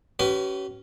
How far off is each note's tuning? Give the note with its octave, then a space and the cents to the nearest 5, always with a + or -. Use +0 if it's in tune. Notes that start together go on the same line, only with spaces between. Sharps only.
C#4 +0 G4 -45 B4 +0